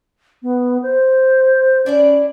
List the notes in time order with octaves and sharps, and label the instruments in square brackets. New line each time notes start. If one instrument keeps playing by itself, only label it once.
[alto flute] B3
C5
[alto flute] C#4 [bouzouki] D4 E4 D5